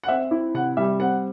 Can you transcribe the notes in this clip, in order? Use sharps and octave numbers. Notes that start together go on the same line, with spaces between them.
F#5
C4 E5
E4
C3 F#5
G3 E5
C4 F#5